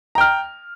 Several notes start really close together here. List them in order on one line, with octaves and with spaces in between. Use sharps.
A#5 G5 F6